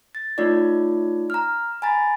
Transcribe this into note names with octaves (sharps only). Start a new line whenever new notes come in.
A6
A3 D#4 F4 C#5 D5
A#5 F6
G#5 A#5 B5 A6